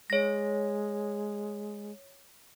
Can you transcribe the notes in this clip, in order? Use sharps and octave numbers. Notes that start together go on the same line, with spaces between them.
G#3 C#5 A#6